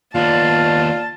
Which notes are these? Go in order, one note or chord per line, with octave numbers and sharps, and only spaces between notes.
D#2 B3 F4 D5 A5